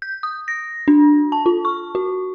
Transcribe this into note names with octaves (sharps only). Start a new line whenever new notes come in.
G6
D#6
A#6
D4
A5
F4
C#6
F#4